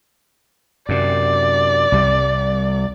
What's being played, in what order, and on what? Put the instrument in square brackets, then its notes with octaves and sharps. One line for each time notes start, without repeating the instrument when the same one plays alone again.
[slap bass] F#2 C3 [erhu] D5
[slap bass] C2 G3